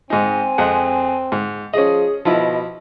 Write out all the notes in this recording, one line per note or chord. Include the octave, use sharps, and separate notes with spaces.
G#2 C4 D#4 G#5
F2 G#3 F#5
G#2
F3 C#4 G#4 D#5
B2 F3 E4 D#5